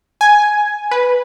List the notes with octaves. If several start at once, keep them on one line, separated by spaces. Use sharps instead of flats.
G#5
B4